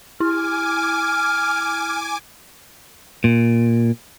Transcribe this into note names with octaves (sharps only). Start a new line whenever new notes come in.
E4 G#5 D6 F6
A#2